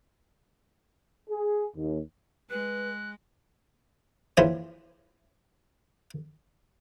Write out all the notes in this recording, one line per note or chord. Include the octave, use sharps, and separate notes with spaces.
G#4
D#2
G#3 B4 F#6
A#1 E3 C#4 C5 C#5